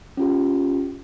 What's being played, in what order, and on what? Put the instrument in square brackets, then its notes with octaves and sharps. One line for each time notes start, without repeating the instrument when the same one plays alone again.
[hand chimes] C#4 F4 G4